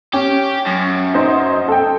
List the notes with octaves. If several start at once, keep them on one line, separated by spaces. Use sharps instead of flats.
C#4 G4
F#2
D#4 C5 D#5
A4 G5